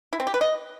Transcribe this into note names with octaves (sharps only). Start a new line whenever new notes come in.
E4
C4
G4
B4
D#5